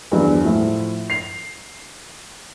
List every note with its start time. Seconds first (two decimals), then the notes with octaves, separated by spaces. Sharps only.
0.11 E2 G2 F3 F#3
0.44 A2 F3
1.10 C7 F7